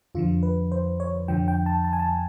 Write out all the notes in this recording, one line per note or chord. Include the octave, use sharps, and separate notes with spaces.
F2 D3 F3 F4
B4
C5
C#5
F2 D3 F3 G5
G5
A5
A5
G#5
A5